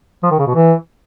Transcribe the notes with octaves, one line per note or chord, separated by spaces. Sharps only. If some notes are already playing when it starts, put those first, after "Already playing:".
F3
D#3
C#3
B2
E3